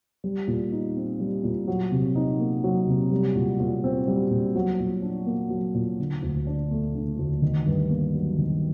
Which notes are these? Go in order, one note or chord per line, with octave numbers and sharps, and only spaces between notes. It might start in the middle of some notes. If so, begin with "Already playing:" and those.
G3
A#2
D#4
C4
G3
A#2
F#3
C3
D#4
A#3
F#3
C3
G3
A#2
A#2
C4
G3
A#2
F#3
A#2
D4
A#3
F#3
A#2
D3
D2
D4
A3
D3
D2
D#3
G2
A#3
F#3
D#3